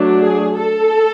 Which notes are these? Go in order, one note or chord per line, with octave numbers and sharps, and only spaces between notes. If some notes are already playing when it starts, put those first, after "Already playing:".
Already playing: F#3 A3 D4
G#4
A4